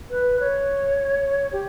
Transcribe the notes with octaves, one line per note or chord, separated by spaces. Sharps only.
B4
C#5
G4